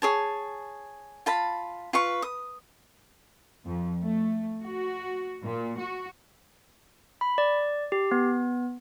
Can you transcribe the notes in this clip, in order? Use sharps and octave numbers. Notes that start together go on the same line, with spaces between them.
G#4 C#5 A5
F4 A5 B5
F4 B4 C#6
D#6
F2
A3
F#4
A#2
F#4
B5
D5
G4
B3